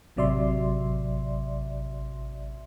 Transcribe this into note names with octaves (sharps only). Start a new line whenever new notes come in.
A1 C3 F#3 D5 E5 C6